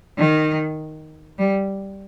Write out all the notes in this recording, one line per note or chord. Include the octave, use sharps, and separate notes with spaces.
D#3
G3